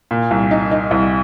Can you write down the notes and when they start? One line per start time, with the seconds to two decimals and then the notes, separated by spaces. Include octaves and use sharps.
0.11 A#2
0.31 C2
0.51 D#4
0.71 D#4
0.91 C2